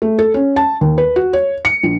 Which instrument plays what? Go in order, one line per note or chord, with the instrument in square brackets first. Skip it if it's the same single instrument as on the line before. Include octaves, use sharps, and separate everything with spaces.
[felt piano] A3
A4
C#4
A5
D#2
B4
F#4
C#5
C#7
A#1